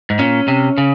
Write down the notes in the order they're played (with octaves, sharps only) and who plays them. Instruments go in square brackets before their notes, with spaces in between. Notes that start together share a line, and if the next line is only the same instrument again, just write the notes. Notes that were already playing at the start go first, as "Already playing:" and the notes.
[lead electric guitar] G#2
[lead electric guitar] A#2 [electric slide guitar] C#4
[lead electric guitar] C3
C#3